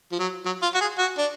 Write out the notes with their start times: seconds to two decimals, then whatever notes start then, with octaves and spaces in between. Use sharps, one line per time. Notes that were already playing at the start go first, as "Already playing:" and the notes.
0.12 F3
0.19 F#3
0.45 F#3
0.62 F4
0.75 F#4
0.81 G#4
0.98 F#4
1.18 D4